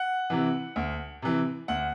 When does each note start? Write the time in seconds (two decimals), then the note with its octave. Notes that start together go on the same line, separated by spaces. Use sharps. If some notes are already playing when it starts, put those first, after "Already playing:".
Already playing: F#5
0.30 C3 E3
0.76 D2
1.22 C3 E3
1.68 D2 F#5